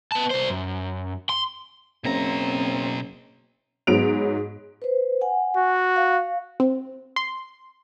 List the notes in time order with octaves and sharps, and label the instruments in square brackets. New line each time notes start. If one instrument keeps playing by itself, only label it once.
[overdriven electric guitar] B3 A5
C2 C5
F#2
C6
[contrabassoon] F#1 [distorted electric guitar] B2 A#5 [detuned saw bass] C4
[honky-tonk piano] G#2 F#3 B3 D7 F7
[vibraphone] B4 C5
F#5 G#5
[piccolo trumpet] F#4
[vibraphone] F5
[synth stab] C4
C6